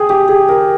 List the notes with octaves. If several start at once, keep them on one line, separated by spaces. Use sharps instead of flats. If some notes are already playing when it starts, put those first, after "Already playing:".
Already playing: G#4 G5
G4
G#4
A#4